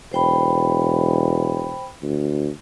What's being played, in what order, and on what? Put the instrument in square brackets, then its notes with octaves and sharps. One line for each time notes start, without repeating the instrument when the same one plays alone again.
[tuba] E1 [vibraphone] C5 G5 B5
[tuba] D2